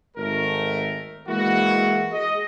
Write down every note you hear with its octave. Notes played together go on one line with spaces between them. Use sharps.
G#1 A3 A#4
E3 G#3 A#3 E4 F#4
G#4 D#5